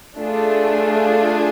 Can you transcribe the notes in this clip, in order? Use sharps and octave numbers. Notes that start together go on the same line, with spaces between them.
A3 D4 F4 G#4